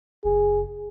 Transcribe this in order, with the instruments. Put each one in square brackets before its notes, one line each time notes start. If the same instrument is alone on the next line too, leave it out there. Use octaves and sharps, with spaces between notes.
[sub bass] F#1 [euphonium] G#4